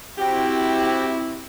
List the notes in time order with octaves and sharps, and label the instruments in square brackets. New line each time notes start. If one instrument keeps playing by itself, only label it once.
[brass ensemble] C4 E4 [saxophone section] F#4 G4 [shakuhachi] G5